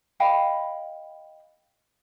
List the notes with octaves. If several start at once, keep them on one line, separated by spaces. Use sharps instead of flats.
D#5 F5 G5 B5